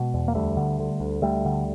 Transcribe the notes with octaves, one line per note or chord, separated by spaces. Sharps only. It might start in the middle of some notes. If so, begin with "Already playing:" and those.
Already playing: B2 G#3
E2
A#3
D2 G3 A3
D3
D3
D2
D2 G3 A3
D3